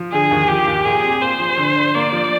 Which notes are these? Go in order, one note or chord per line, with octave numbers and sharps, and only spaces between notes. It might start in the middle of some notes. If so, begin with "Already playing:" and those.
Already playing: F3
D3 G#4
D#2
F3 G4
D#2
A#2 G#4
C4
A#2 C5
F3
D3
D4
A#3 D5
F3